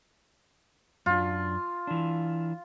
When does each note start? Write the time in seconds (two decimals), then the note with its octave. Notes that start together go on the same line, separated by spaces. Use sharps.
1.06 F#2 D4 F4
1.87 E3 D4